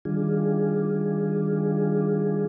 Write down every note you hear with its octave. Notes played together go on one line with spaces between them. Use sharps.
D#3 G3 D4 F4 G#4